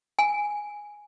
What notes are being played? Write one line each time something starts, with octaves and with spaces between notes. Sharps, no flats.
G#5